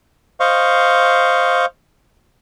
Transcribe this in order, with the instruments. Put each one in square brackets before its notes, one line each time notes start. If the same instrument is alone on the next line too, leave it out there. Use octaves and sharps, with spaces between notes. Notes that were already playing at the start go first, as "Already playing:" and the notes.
[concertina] C5 D#5 F5 C#6